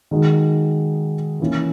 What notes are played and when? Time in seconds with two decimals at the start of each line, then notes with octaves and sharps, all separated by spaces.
0.11 D#3 G#3 D#4 F#4
1.40 E3 A#3 C#4 E4